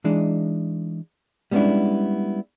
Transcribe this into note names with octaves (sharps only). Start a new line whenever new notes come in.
E3 G#3 D4 D#4
G3 G#3 B3 C#4 D4 E4